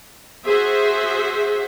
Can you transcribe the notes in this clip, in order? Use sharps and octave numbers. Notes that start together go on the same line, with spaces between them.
F#4 G#4 C5 E5